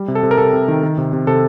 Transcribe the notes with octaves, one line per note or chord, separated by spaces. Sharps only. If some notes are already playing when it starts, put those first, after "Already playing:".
Already playing: G3
C3
A4
C3
A#4
C3 A4
C3
D#3
D#3
C3
C3
C3 A4